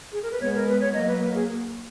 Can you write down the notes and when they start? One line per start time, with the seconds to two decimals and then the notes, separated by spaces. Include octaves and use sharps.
0.12 G#4
0.23 A#4
0.31 B4
0.40 G#3 B3 C#5
0.54 A#4
0.68 B4
0.80 C#5
0.94 F#3 A#3 D#5
1.07 B4
1.21 B4
1.34 G#4